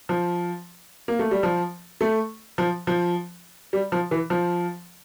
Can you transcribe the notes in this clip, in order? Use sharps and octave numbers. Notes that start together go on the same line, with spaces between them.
F3
A#3
A3
G3
F3
A3
F3
F3
G3
F3
E3
F3